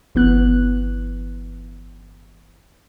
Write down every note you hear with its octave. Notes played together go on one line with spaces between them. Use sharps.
G1 E3 B3 F#6